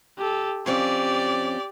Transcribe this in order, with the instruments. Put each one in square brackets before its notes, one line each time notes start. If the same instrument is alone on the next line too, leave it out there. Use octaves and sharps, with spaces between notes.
[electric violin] G4 A4
[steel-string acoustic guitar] F2 C4 C#4 [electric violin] G4 [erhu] D5